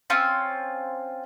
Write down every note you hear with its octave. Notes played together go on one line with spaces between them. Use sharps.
C4 C#4 F4